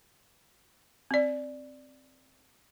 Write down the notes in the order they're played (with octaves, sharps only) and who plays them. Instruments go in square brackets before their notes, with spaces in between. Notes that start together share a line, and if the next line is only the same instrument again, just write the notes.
[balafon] C4 D5